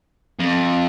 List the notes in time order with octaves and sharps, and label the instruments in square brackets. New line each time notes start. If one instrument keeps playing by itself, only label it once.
[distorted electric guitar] F2